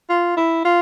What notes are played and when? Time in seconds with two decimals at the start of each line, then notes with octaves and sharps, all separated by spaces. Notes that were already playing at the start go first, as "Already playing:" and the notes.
0.09 F4
0.37 E4
0.65 F4